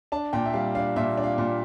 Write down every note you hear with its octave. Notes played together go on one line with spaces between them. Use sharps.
D4 A5
A#2 G5
E5
G3 F5
D4 F5
A#2 E5
D4
F5
A#2